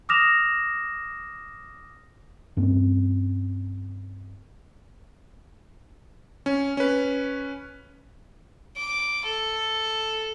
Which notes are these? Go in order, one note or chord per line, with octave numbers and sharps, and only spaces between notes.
D6 D#6 F6 A#6 E7 F7
G2 A#3 C4 C#4
C#4
C#4 B4
D6
A4